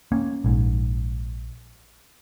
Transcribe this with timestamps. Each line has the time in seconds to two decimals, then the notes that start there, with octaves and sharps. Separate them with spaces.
0.12 A#3 C#4
0.44 A#1 G#2